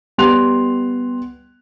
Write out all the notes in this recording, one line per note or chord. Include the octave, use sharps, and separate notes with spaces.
G3 B3 C6 F#6 F7